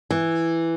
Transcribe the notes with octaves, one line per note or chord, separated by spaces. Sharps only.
E3